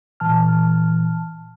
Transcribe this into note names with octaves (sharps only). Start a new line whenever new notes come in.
A#2 E3 A5 F6